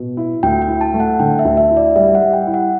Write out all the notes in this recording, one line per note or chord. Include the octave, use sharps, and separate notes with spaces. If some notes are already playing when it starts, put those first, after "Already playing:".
Already playing: B2
E4
D2 G5
G5
E4
A5
A3
F#5
D3 G5
E5
D2
E5
E4
D5
G3 E5
F#5
G3
G5
E4
F#5